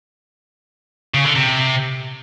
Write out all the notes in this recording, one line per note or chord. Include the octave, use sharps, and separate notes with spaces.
C#3
D3
C3